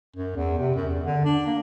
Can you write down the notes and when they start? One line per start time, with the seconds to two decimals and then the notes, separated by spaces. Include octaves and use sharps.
0.16 F#2
0.36 E2
0.58 C3
0.75 F#2
0.87 E2
1.05 D3
1.25 D4
1.46 A#3